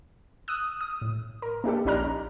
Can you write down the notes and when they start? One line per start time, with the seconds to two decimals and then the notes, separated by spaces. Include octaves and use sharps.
0.48 D#6 E6 F#6
0.81 D#6
1.01 A2
1.42 A#4
1.64 A#3 D4 G4 A4
1.85 A#1 C#4 D#4 D5 A#5 F6